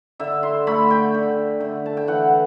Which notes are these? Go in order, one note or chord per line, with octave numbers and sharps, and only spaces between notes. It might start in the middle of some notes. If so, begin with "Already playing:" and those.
D3 E5
C6
A3 B5
G5
D3
D3
A5
G5
E3 F#5